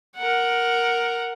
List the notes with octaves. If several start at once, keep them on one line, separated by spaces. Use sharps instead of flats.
A#4 F#5